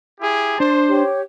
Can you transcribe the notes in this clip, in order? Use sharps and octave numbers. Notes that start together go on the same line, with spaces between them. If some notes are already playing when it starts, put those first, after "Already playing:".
E4 G4 G#4
D4 C5 A5
G4 C#5